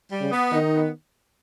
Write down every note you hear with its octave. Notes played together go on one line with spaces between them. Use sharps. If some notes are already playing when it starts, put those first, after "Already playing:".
G3
C#3
B3
D#3 D#4
B3